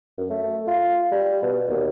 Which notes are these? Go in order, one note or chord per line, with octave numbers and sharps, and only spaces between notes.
F#2
A3
F4
G3
B2
D#2